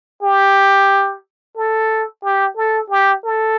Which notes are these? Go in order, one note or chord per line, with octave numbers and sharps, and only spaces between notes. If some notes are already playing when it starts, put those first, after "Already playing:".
G4
A4
G4
A4
G4
A4